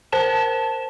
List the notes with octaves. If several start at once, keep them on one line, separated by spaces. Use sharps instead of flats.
A#4 C5 A5 E7